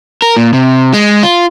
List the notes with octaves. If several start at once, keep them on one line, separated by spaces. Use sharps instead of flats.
A#4
A#2
C3
G#3
F4